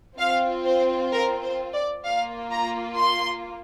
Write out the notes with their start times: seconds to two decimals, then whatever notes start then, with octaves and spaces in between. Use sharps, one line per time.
0.18 C4 F4 F5
0.66 C5
1.12 A#4
1.42 C5
1.74 D5
2.05 A#3 F4 F5
2.52 A#5
2.97 C6